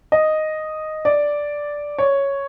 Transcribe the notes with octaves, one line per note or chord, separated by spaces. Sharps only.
D#5
D5
C#5